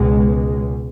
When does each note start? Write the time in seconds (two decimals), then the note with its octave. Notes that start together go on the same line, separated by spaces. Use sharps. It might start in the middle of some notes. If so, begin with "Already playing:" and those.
Already playing: C#2 B2 G#3